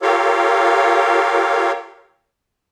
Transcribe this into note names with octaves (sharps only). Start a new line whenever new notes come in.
F4 G4 A4 A#4 C#5 F5